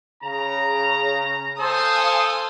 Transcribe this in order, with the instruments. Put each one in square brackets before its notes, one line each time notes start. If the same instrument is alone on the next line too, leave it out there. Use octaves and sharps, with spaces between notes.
[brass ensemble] C#3 A#5
[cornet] A4 [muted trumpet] C5 [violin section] F5 G#5 D#6